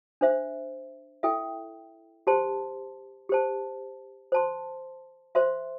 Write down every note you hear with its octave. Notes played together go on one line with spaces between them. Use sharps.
D4 C5 E5
E4 A4 E5 G5
G4 C5 A5 C6
G4 C5 A5
C5 A5 C6
C5 E5 C6